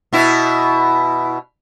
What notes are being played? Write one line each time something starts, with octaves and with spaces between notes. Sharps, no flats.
B2 E4